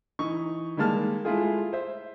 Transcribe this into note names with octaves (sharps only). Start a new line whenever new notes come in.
E3 D#4 C#6
D#3 G3 G#3 A#3 A5 F6
G#3 A3 E4 F4 G#4
C5 E5